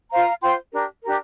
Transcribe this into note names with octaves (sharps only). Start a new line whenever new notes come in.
F4 C5 F5 A#5
F4 C5 G5 C6
D4 G4 A#4
D4 G4 A#4